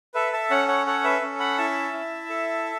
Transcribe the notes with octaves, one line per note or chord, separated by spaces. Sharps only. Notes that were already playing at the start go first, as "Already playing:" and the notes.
A4 B4 E5
E5 A5
C#4 C#5 F#5
C#5 F#5
A4 C#5 F#5
B4 E5
C#4
F#5 B5
E4 E5 A5
E4
A4